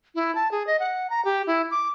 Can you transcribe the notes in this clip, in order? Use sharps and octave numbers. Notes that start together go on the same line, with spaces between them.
E4
A5
G#4
D#5
F#5
A#5
G4
E4
D6